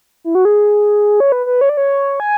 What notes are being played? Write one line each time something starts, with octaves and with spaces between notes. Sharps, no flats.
E4
F#4
G#4
C#5
B4
B4
C#5
D5
C#5
G#5